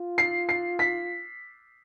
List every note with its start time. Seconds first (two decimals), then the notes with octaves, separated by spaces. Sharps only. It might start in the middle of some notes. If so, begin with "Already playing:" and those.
Already playing: F4
0.18 C7
0.49 C7
0.79 B6